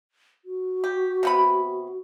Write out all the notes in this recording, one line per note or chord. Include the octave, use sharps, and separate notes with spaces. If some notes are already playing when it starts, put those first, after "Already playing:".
F#4
G4
C3 B3 B5